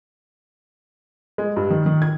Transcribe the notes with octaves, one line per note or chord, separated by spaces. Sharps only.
G#3
G2
D#3
D#3
G#6